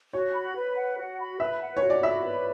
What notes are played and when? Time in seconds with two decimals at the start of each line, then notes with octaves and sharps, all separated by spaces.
0.13 F#4 C#5
0.35 B5
0.56 B4
0.77 F#5
0.98 F#4
1.19 B5
1.40 B4 E5
1.61 F#5
1.77 C#5
1.83 F#4
1.90 D5
2.03 E5 B5
2.24 B4